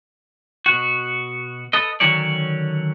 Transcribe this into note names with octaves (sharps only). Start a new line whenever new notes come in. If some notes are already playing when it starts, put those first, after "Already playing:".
B2 F#4
A4 B4 D#5
D3 D#3 F#3 C#4 C#5 D5